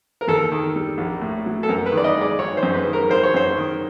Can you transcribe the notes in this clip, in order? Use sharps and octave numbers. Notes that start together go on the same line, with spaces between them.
A#4
D#2 A4
D#3
G3
A#1
A2
F#3
A4
F#2 A#4
B4
D#3
D5
D#5
G#3 D5
G#1 C#5
C5
F#2
B4
D#3
A#4
G#1 C5
C#5
F#2 C5
D#3